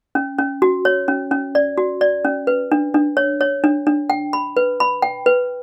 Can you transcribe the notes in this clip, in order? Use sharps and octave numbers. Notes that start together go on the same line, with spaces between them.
C#4
C#4
F#4
C#5
C#4
C#4
D5
F#4
D5
C#4
B4
D4
D4
C#5
C#5
D4
D4
G5
B5
B4
B5
G5
B4